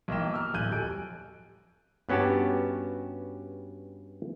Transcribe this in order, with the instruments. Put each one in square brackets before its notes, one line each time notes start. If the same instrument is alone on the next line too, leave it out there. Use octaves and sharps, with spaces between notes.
[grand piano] B1 E3 A#3 D#5 G5 E7
D6 E6 F6
D1 B1 G#5 F#6 G6 D#7
F2 G3 A4 G#5 F#6 D7
[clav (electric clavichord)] G2 B3 C#4 F#4 G4 A5